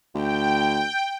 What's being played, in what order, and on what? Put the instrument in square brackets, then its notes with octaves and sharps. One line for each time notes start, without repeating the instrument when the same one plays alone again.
[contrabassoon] D2 [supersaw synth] G5